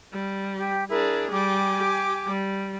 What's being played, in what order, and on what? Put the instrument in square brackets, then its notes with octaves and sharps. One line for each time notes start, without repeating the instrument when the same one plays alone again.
[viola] G3
[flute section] G4 G5
[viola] D4 G#4 [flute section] E4 A#4
[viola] G3 [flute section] G5 G#5 D6
[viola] G4
G3